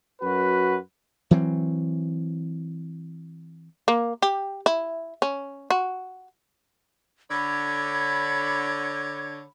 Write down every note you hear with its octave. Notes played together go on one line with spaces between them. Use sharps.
F#2 F#4 B4
E3 F#3 C4
A#3
G4
E4
C#4
F#4
D3 C#5 B5 G#6